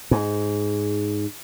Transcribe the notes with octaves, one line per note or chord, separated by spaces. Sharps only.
G#2